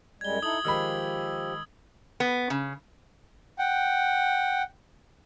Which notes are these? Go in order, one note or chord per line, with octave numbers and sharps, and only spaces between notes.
F#2 G3 G#3 G#6 G7
D#4 E4 A4 D#6 F#7
D#3 F3 G#3 G4 B5 E6
B3
C#3
F#5 G5